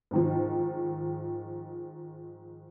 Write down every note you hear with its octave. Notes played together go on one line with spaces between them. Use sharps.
G#2 D#3 F3